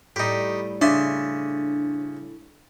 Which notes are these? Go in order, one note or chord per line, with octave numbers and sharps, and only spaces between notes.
A2 G3 D#4 G4
C#3 D4 E5 C6